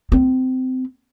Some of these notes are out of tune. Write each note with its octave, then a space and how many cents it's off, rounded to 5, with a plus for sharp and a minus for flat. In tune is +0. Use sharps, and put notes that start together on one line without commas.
C4 -25